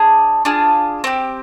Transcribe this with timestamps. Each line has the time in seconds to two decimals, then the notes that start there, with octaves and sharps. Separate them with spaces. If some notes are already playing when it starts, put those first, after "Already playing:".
Already playing: D4 G#4
0.45 D4 F4 G#4
1.04 C4 G4